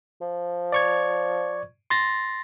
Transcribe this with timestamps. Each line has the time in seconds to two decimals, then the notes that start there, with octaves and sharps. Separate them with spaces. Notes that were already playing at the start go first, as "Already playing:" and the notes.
0.21 F3
0.72 D5 C#6 G#6
1.90 C6 A6 A#6